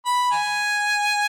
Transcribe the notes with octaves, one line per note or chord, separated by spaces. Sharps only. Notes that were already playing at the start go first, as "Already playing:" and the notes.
B5
G#5